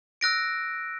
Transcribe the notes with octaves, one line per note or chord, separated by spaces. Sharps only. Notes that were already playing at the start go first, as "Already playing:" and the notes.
E6 F#6 A#6 D7